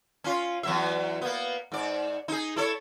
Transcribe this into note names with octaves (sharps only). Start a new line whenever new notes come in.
C#4 F4
E2 F#3 E5
A#3 B3
G#2 D5
D#4 G#4
E4 A4 C#5